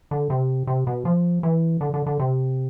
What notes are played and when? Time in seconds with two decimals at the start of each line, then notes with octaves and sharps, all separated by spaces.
0.11 D3
0.30 C3
0.67 C3
0.87 B2
1.05 F3
1.43 E3
1.81 D3
1.94 D3
2.06 D3
2.19 C3